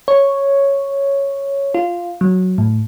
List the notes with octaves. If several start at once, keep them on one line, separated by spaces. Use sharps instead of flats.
C#5
F4
F#3
A2